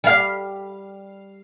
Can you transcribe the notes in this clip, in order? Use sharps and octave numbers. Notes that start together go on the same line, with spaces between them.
G3 F5